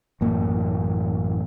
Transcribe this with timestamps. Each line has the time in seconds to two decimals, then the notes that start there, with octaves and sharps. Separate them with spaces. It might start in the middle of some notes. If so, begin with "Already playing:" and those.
0.21 A1 F#2 A#3